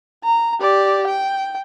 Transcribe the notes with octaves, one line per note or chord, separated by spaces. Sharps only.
A#5
G4 D5
G5